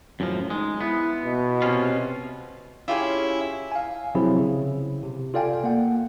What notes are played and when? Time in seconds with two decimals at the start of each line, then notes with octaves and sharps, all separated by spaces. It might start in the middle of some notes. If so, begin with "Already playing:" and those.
0.20 F#2 A2 F3
0.50 G#3 D#4
0.81 B3 E4
1.25 B2
1.62 C3 C#4 F4
2.88 C#4 E4 F4 G4 G#4
3.72 F5 G#5
4.15 C3 F3 F#3 C4 E4 G#4
4.39 C#3
5.03 C3
5.34 F4 A4 D5 F5 G5 G#5
5.64 A#3 F#5